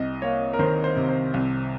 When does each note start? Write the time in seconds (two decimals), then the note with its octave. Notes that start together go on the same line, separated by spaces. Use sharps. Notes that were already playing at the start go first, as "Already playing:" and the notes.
Already playing: C2 D#5
0.22 A#3 C#5
0.53 A#4
0.59 D#3 C5
0.84 C5
0.97 C3
1.09 C5
1.34 C2